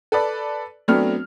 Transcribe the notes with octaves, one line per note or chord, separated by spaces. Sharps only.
A4 B4 D5
F#3 A3 B3 C4 D4 F6